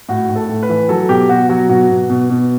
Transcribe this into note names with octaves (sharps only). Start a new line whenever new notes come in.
A2 F#4
A2
A4
A2
B4
E3
F#3 A4
B2 G4
B2 F#4
F#3 F#4
B2 F#4
B2
B2
B2